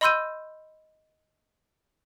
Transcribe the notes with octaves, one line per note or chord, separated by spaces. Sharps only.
D#5 B5 C6 E6 G6 D#7